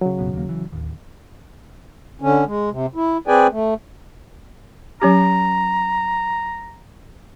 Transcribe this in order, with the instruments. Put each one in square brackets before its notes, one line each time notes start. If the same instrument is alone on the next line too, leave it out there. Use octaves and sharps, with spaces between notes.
[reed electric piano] C#3 F#3
[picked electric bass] F#1 C2 B2
D#2 A#3
E3
D1 D#2
[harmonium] D3 C#4
G#3
C3
E4
C4 G#4 B4 D5 G5 G#5
A3
[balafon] F#3 C#4 G4 [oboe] A#5